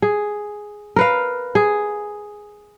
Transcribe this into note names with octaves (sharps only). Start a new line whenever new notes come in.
G#4
A#4 B4 F5
G#4